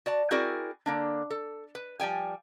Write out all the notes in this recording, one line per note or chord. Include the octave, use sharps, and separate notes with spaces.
F#4 D5 A5
C4 E4 F#4 G#4 A#4 D5
D3 A#3 D4
A4
B4
F3 G3 G5 G#5